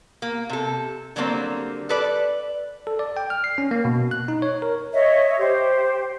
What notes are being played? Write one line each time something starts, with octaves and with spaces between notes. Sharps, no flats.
A#3
C3 A4
D3 F#3 G3 A#3 C4
A4 B4 D5
A4
D5
G5
F6
C7
C#4
A#3
B2
F#6
D#4
C#5
A#4
C#5 D#5 E5
G4 C5